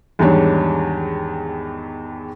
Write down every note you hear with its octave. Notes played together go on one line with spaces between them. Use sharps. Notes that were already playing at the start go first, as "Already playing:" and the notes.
E2 G#2 D#3 G3 D4 C#5